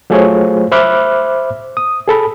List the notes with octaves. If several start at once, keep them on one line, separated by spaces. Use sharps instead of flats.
F#3 A3 F4 G#4 C5 C#5
C5 E5 B5 D6 F6 F#6
D#6
G#4 A4 B5